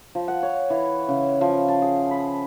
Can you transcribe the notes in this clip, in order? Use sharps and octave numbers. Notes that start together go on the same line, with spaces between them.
F3
F#5
C#5
E3
C#3
F3
A5
G#4
B5